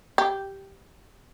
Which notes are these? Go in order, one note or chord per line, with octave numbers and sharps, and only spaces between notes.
G4